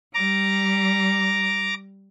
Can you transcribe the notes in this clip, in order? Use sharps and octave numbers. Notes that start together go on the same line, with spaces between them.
G3 A#5 D6